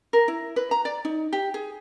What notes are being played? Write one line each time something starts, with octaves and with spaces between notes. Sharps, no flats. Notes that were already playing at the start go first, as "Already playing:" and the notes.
A#4
E4
B4
A#5
D5
D#4
G4
G#4